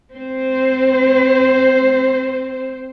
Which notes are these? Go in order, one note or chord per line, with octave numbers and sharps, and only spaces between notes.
C4 C5